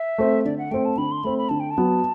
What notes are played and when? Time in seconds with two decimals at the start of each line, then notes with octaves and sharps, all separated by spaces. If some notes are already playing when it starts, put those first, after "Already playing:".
Already playing: E5
0.18 A3 C4
0.45 D3 D5
0.58 F#5
0.71 A3 C4 G5
0.85 A5
0.98 D3 B5
1.12 C6
1.24 A3 C4 B5
1.38 B5
1.49 D3 A5
1.60 G5
1.71 A5
1.78 F#3 B3 F#4